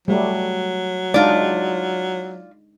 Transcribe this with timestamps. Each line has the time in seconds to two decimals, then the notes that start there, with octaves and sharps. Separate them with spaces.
0.08 F#3 G3 A3
1.14 G#3 D4 D#4 F4 D5